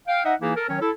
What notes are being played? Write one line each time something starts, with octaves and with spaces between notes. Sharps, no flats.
F5 G5
D#4 D#5 E5 F#5
E3 A#3 D#4 E4 G#4
A4 A#4
D#3 F#3 C#4 C#5
E4 A4